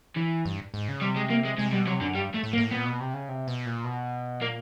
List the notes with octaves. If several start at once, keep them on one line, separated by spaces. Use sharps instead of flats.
E3
G2
G#2
C#3
C3 G3
G#3
A#3
G#3
C3 G#3
B2 G3
C3 F#3
F#2 D3
G2 G3
A3
A2
A#3
A2
A#2 B3
B2
C3
C#3
C3
B2
A#2
B2
A#2 A#3